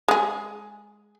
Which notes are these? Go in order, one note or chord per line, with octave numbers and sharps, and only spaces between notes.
G#3 G#4